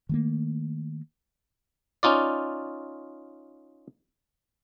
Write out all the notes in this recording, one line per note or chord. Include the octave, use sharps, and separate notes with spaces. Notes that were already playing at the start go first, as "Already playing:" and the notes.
D#3 A3 A#3
C#4 D#4 F4 D5